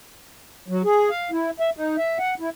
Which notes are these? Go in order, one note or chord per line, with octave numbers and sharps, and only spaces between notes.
F#3
G#4
F5
E4
E5
D#4
E5
F#5
E4